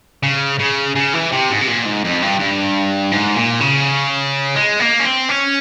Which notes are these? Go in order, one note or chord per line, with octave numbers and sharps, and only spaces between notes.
C#3
C#3
C#3
E3
C3
G#2
C3
A#2
G#2
F2
G2
G2
G#2
A#2
C#3
G#3
A#3
C#4
C4
C#4